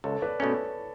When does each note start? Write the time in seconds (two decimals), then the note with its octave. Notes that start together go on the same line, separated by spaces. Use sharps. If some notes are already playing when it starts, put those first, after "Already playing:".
0.04 C#2 A4 C#5
0.22 B4 D5
0.40 B2 A3 C#4 A4 C#5